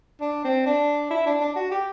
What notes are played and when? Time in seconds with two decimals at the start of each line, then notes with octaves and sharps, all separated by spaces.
0.21 D4
0.44 C4
0.66 D4
1.10 E4
1.26 D4
1.40 D4
1.56 F#4
1.71 G4